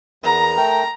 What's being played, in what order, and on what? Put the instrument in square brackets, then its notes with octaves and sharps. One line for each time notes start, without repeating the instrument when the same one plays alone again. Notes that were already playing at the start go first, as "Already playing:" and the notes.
[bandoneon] E2 B3 A#4 [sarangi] A#5
[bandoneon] A3 A#4 G5